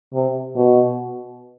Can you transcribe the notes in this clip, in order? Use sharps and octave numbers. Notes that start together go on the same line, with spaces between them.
C3
B2